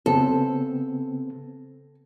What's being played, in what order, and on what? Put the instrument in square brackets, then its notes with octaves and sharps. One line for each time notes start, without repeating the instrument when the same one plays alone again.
[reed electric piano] C#3 B3 C4 [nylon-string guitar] A4